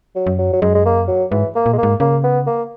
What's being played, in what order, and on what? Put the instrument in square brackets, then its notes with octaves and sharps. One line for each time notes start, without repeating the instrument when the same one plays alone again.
[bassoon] F#3
[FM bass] F#2
[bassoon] F#3
F#3
[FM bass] F#2 [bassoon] G#3
[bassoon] G#3
A#3
F#3
[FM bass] G#2 [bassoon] E3
[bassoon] A#3
[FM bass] A#2
[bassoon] G#3
A#3
[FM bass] G#2
[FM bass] C#3 [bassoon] A#3
[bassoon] B3
A#3